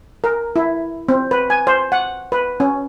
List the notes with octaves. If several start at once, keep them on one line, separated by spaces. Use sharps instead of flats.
A#4
E4
C4
B4
G#5
C5
F#5
B4
C#4